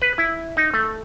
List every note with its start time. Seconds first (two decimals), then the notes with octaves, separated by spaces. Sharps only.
0.02 B4
0.18 E4
0.57 D#4
0.74 A3